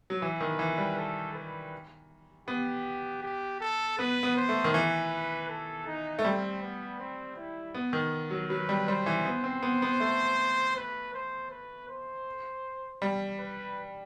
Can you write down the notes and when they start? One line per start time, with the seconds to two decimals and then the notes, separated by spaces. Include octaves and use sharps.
0.10 F#3
0.22 E3 B4
0.41 D#3
0.59 E3
0.78 G3
0.98 A4
1.35 B4
2.48 B3 G4
3.22 G4
3.61 A4
3.99 B3 B4
4.23 B3
4.36 C5
4.49 A3
4.64 D#3
4.74 E3 B4
5.49 A4
5.86 D#4
6.19 A3
6.24 G3 C4
6.62 B3
6.99 C4
7.37 E4
7.75 B3
7.93 D#3
8.31 F#3
8.50 F#3 B4
8.69 G3
8.88 G3 C5
9.06 E3
9.25 B3
9.44 C4
9.63 B3
9.82 B3
10.00 A3
10.76 B4
11.14 C5
11.51 B4
11.89 C5
13.02 G3
13.39 B4